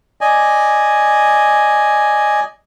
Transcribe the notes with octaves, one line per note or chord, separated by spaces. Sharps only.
D5 D#5 G#5